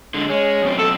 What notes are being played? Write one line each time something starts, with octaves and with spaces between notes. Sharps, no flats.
D3 G#3
G#3 C#4
F#2 B2 C4
A4